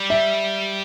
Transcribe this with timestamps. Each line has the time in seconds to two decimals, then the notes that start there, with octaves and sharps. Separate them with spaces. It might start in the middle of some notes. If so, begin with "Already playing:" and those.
Already playing: G3
0.10 E5